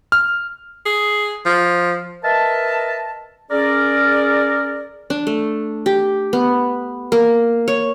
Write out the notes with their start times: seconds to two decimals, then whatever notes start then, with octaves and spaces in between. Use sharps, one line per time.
0.12 F6
0.86 G#4
1.46 F3
2.23 A#4 B4 D#5 E5 A5
3.51 C#4 G#4 A#4 D5
5.10 D4
5.27 A3
5.86 G4
6.33 B3
7.12 A#3
7.68 C#5